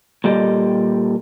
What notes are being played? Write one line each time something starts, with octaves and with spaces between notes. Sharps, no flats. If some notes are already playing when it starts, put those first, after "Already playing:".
A#2 G3 G4 A4 D#5